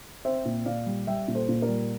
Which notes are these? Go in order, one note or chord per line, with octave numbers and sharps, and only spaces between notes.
C4 C5 E5
A#2
A#2 D5 F5
G3
G3 E5 G5
A#2
A4 C5
A#2
A#4 D5
G3